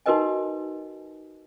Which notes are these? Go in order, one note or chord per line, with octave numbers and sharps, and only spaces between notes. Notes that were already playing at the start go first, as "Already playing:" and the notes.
D#4 F#4 A#4 B4 D#5 G#5